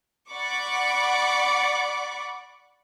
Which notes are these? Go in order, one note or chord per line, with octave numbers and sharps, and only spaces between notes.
D5 F#5 B5 C#6 D6